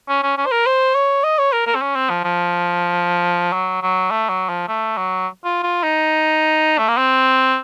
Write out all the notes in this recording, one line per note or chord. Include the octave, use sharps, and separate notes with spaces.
C#4
C#4
C#4
C5
A#4
C5
C#5
D#5
C#5
A#4
A#4
C4
C#4
C4
F3
F3
F#3
F#3
A3
F#3
F3
A3
F#3
F4
F4
D#4
A3
A#3
C4